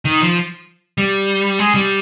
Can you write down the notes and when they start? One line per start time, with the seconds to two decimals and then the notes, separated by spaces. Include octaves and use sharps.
0.05 D#3
0.21 F3
0.98 G3
1.59 G#3
1.75 G3